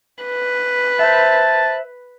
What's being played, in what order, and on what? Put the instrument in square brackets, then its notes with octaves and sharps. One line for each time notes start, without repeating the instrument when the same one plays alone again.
[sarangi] B4
[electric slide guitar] C5 E5 [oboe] A5